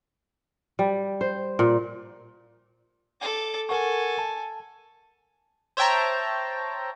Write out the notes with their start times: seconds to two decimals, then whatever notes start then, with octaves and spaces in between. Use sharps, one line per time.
0.79 G3
1.21 C5
1.59 A#2
3.21 A4 D6
3.69 A4 A#4 F#5 G#5 C#6
4.19 A5
5.77 C5 C#5 E5 G5 A5 A#5